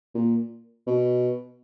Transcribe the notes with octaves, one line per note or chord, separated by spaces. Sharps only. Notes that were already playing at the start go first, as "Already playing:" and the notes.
A#2
B2